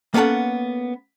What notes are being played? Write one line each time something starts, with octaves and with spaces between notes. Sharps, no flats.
A#3 B3 C#4 A4 F#5